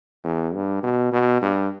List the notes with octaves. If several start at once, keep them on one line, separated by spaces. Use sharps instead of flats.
E2
G2
B2
B2
G2